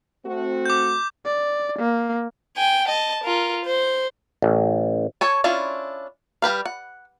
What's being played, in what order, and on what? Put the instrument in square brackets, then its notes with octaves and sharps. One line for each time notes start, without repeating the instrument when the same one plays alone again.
[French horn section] A3 C4 F#4
[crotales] D6 G6
[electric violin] D5
A#3
[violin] G5 G#5
D#5 A5
F4 A#4
C5
[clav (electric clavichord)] A1
[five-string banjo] A4 C#5 G#5
C#4 D4 E4 F4 F5
G3 G4 B4 F5
F#5